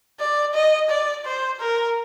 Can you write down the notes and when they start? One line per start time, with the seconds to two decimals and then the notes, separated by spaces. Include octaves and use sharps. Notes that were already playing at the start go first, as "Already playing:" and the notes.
0.20 D5
0.54 D#5
0.90 D5
1.25 C5
1.61 A#4